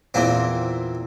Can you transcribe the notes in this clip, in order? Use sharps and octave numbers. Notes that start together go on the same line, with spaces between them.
E2 A#2 C4